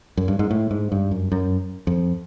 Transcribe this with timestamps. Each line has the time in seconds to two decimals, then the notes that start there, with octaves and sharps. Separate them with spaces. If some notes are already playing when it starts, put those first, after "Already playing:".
0.17 F#2
0.28 G2
0.39 G#2
0.51 A2
0.71 G#2
0.92 G2
1.11 F#2
1.32 F#2
1.87 F2